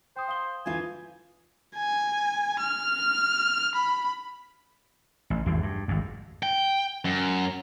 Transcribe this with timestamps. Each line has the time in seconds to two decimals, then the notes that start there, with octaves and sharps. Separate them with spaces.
0.16 C5 G5 D#6
0.28 F5 D#6 G7
0.66 D2 E3 F4 G#5
1.76 G#5
2.59 F6
3.75 B5
5.30 A1
5.46 G#1 E2 E3 G3
5.63 G2
5.88 G#1 F2
6.43 G5
7.05 F#2